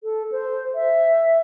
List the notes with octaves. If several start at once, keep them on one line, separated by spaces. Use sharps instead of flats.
A4
C5
E5